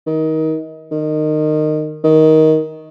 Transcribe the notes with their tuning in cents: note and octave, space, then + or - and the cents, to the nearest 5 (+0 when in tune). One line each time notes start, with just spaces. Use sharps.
D#3 +25
D#3 -20
D#3 +15